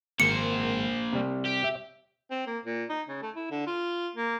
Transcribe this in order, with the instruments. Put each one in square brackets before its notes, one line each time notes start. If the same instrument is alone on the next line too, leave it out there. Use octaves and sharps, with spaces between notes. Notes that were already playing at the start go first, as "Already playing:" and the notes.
[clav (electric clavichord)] G#1 [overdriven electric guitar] A#3 C5 [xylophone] C#7
[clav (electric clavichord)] C3 G3
[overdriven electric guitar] G4
[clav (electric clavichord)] E5
[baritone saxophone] C4
A#3
A#2
D#4
C#3
A3
E4
D3
F4
A#3